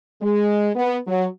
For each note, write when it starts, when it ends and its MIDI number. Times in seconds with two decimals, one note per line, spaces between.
0.22 0.70 56
0.76 0.98 59
1.07 1.26 54